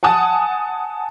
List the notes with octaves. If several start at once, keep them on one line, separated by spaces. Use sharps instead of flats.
F#5 G#5 A5 D#6